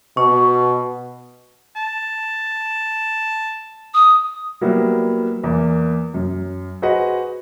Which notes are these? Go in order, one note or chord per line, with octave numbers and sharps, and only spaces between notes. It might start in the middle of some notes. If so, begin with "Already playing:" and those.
B2 C#6
A5
D#6
F#3 G3 A#3 B3 E4
E2 E3 A#3
F#2
F#4 G#4 B4 C5 D#5 F#5